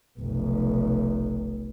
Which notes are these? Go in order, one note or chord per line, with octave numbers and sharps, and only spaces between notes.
F1 B1